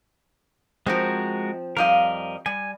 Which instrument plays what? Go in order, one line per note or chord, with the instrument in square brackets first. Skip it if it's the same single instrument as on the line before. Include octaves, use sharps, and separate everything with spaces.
[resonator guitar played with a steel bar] F3 C4 [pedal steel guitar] G#3 F#4 A#4
[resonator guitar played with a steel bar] F2 G3 F5 [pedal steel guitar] A#4 D#5
[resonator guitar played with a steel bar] G3 [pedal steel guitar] G#5